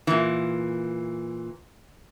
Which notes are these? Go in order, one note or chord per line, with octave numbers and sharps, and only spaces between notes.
A#2 E3